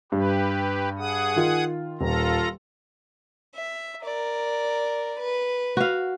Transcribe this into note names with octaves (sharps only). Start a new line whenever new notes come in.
G2 G4 B4
G#4 F#5 D#6
D#3 F4
D#1 F4 A4 A#5
E5
A#4 D5
B4
F#4 F5